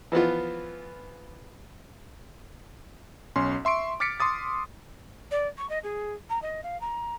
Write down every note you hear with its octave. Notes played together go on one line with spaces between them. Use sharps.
E3 F3 B3 F4
B1 C#4 C6
E5 C6 C#6 D7
D6 F6 A6 B6 C#7 D7
C6 D6 D#6 A6
D5
C#6
D#5
G#4
A#5
D#5
F5
A#5